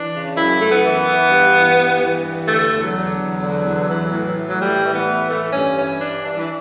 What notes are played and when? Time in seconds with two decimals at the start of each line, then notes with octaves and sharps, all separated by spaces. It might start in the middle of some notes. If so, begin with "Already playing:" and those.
Already playing: E3 D4
0.13 C#3
0.36 F#2 E4
0.60 F#2 A3
0.72 B3
0.84 E3
1.07 E3
1.30 G2
1.54 E3
1.78 G2
2.01 E3
2.25 G2
2.48 D3 A3
2.71 E2
2.83 F#3
2.95 D3
3.19 E2
3.42 D3
3.65 E2
3.89 E3
4.12 A2
4.35 E3
4.49 F#3
4.59 A2 G3
4.84 E3
4.95 B3
5.07 A2
5.30 E3 A3
5.53 G2 C#4
5.77 E3 C#4
6.00 G2 D4
6.25 E3 D4
6.36 E3